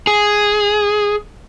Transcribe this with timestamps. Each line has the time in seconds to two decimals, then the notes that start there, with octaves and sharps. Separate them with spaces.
0.07 G#4